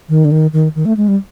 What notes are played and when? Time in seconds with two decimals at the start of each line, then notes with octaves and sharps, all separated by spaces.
0.09 D#3
0.25 D3
0.32 D#3
0.53 D#3
0.75 D#3
0.85 A3
0.97 G#3
1.08 G3